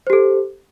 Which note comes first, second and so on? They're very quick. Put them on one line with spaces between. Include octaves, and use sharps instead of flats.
C5 G4 A4